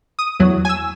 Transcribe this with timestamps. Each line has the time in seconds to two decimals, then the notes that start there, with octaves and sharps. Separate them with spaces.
0.19 D#6
0.40 E2 F#3
0.65 G#5 E6